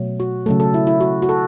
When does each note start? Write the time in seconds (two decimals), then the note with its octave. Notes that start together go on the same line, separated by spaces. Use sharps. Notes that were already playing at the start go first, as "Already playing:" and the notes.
Already playing: B2 F#3 A3
0.20 F#4
0.46 C#3 F#3 A3 A4
0.60 A4
0.74 E4
0.87 E4
1.01 F#4
1.22 F#4
1.29 A4